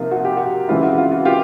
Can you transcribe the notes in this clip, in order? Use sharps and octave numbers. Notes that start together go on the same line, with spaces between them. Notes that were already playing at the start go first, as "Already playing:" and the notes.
Already playing: C3 F3 A#3 D#4 F4
F#4
G4
F#4
C#3 E3 G#3 C4 E4 F4
F#4
F4
F#4
F4 G4